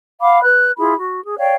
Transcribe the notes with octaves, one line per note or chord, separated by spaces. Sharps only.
F5 F#5 B5 D6
B4 F#6
E4 F4 G#4 B5
F#4
G#4
C#5 D5 F5 G5